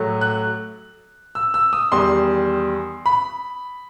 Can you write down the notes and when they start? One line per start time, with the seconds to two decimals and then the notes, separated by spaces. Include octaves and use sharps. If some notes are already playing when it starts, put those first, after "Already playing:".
Already playing: A2 F#3 A3
0.21 F#6
1.35 E6
1.54 E6
1.73 D#6
1.92 E2 D#3 G3 C6
3.06 B5